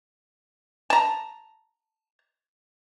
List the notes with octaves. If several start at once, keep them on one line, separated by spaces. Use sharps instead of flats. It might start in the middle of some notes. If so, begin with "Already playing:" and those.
A5 A#5